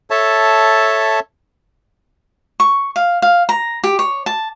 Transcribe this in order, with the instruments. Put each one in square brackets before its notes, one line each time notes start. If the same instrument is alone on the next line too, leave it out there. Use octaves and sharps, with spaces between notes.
[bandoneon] A4 C#5 E5 A5
[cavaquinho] C#6
F5
F5
A#5
G4
C#5
A5